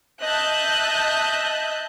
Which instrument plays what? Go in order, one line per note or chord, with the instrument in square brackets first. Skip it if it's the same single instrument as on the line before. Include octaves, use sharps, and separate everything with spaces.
[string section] D#5 E5 A5 F#6 G6